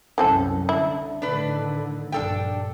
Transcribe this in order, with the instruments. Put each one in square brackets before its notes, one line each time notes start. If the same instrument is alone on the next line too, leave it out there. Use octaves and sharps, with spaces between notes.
[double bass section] C2 F#2 C#4 [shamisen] E3 C4 A4
[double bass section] D3 [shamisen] E4
[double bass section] A2 D3 D#3 [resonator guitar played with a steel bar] D4 B4
[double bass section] A#1 G2 [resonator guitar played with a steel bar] D4 A4 G5